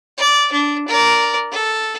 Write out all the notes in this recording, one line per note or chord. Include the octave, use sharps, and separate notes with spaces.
D5
D4
A#4 D5
A4